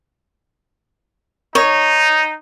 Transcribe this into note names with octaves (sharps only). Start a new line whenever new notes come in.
D#4 C#5